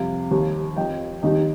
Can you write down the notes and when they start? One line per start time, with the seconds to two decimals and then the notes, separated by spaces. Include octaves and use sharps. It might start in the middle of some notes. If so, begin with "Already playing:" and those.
Already playing: F2 C3 G3 F5
0.31 D#2 D#3 G3
0.77 F2 F3 D#5 G5
1.23 D#2 D#3 G3 D#4 G4